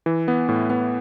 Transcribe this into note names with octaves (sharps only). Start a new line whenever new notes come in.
E3
B3
A2
B3